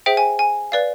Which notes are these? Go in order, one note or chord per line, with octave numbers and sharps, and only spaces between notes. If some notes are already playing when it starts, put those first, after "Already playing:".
G#4 C5 E5 G5
G#5
G#5
B4 D5 F5